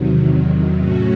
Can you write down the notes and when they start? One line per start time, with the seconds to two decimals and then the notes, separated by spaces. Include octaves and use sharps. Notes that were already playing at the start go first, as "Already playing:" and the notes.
Already playing: E2 C3 D#3 F#3
0.78 A2 F#3 A3 C#4 F#4